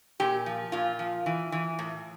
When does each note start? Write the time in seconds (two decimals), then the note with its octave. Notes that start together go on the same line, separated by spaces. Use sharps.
0.20 A#2 G4
0.46 F3
0.72 A#2 F4
0.99 F3
1.26 E3
1.52 E3
1.79 A2